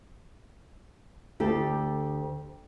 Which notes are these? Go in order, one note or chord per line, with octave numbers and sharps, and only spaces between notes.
D2 G4 A4